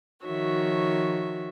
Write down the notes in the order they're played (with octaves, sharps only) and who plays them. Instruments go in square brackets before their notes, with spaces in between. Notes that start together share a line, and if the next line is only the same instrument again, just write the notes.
[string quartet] D#3 F3 F#4 C#5 E5